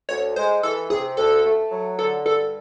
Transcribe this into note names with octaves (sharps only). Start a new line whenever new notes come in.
D2 C#5
G#3 C5
E3 A4
C3 G#4
D2 A4
A3
F#3
D3 A4
G2 A4